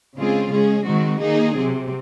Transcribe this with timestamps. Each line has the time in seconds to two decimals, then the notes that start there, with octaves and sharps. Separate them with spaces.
0.16 C#3 G#3 C4 F4 G#4
0.51 G#3 C#4 G#4
0.86 D#3 G#3 C4 F#4
1.21 D#3 A#3 D#4 G#4
1.56 C3 F#3 C4